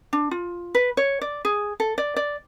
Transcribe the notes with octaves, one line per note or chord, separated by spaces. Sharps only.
D4
F4
B4
C#5
D5
G#4
A4
D5
D5